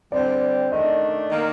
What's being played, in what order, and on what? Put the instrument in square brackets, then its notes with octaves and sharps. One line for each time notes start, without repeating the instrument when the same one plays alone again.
[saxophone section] D3 G3 C4 [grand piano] D5
[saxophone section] D#3 A3 D4 [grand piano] D#5
[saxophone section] D#3 A#3